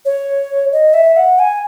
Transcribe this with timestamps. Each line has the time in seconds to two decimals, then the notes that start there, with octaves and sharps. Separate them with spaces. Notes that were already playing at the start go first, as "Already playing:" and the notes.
0.05 C#5
0.72 D#5
0.94 E5
1.17 F#5
1.39 G#5